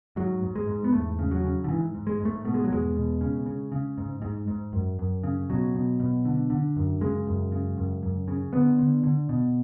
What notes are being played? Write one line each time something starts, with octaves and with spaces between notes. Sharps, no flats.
G#2 F#3
G#2
G#3
G#2
B3
E2 A3
C#3
F#3
C#3
D3
G#2 E3
G#2
G#3
G#2
A3
B2 A3
G#3
F#3
E2 G#3
B2
C#3
C#3
C#3
G#2
G#2
G#2
F#2
F#2
C#3
B2 F#3
B2
B2
D3
D3
F#2
C#3 G#3
F#2
C#3
F#2
F#2
C#3
D3 B3
D3
D3
B2